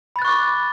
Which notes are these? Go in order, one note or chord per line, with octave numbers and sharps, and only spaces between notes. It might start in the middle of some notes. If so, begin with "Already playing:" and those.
B5 C#6 D6 F#6 A6